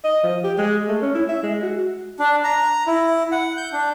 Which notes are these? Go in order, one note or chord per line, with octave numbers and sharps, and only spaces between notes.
D#5
F3
G4
G#3
A3
C#4
E4
E5
G#3
F#4
D4
A#5
E4
F#5
G6
D4